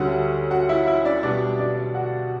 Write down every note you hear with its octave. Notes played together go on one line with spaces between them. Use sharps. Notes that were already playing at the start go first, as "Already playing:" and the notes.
Already playing: D2 D3 G3 C#4 F#4 F#5
F#4 F#5
E4 E5
E4 E5
D4 D5
B2 G3 B3 D4 D5
D4 D5
F#4 F#5